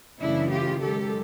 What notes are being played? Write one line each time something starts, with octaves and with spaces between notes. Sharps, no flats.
F#2 C#3 E3 A3 D4 E4
F4 G4
F#2 D#3 G#3 G4 A4